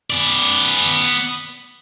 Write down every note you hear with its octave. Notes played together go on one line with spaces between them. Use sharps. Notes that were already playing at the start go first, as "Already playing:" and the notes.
B3 D5